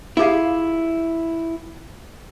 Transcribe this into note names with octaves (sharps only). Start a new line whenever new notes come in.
E4 F4 G4 G#4 F5